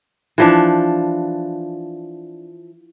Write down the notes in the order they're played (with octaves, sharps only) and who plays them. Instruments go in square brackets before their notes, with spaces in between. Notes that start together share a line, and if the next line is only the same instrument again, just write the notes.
[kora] E3 F3 D4